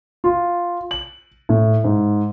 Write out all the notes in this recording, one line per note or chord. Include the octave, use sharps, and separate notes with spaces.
F4
F#7
A2
G#2